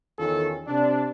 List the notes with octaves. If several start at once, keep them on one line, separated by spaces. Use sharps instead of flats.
E2 D#3 C#4 F4 A4
C3 D4